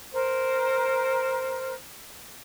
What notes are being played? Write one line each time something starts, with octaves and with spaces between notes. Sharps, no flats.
A#4 C5